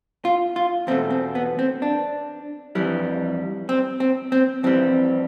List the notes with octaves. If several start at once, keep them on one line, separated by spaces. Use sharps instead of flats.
F4
F4
E2 B2 A3 C4
C4
B3
C4
D4
F2 E3 G3
C4
C4
C4
F2 E3 G3 C4